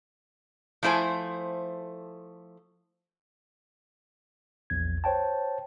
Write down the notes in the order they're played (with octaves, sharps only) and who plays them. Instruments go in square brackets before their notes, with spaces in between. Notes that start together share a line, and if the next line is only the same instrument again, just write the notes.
[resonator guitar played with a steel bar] F3 A3 E4 C5 G#5
[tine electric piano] A#1 E2 G#6
C5 C#5 G5 A5